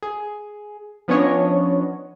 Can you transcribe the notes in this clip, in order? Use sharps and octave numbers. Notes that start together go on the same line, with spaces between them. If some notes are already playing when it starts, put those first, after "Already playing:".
G#4
F3 B3 C#4 D4 C#5 D#5